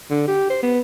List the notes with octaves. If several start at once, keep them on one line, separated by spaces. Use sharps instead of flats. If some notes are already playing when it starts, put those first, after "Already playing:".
D3
G4
C5
B3